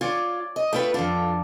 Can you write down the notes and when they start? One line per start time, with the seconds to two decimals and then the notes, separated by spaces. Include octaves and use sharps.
0.01 F4 C#5 D5 G#5
0.56 D#5
0.73 A3 F4 B4 G5
0.94 F2 D4 F4